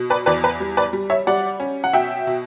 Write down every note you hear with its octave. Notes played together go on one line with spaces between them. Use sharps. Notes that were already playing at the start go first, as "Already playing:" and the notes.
Already playing: B2
B4 D5
E2 B4 D5
B4
G3
B4 D5
G3
C#5 E5
G3 D5 F#5
C#4
F#5
B2 E5 G5
B2